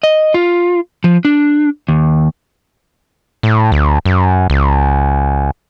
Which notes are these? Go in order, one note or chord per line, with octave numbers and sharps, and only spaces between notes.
D#5
F4
F3
D4
D#2
A2
D2
F#2
C#2